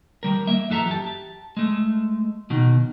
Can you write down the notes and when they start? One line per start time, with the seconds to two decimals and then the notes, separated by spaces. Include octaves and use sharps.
0.23 D#3 G3 A#4
0.47 A#3 E5
0.70 F#2 E3 A4 E5 A#5
0.87 G4 A5
1.57 G#3 A3
2.50 B2 D#3